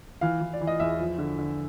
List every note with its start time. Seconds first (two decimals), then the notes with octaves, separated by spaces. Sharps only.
0.21 E3 F5
0.41 E3
0.53 D5
0.61 E3
0.67 D#5
0.80 E2 E5
0.99 F3
1.18 D3
1.38 D3